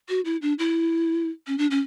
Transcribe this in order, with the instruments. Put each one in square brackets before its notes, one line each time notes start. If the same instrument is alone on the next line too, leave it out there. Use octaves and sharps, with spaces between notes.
[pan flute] F#4
E4
D4
E4
C#4
D4
C#4